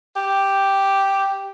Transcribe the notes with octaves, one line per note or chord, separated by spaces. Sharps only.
G4